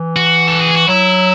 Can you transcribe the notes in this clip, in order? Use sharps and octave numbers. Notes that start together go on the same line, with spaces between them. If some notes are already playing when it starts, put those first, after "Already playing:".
Already playing: E3
F#4
A4
G#4
F#4
F#3 E4